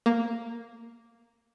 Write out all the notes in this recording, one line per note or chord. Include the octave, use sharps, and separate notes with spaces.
A#3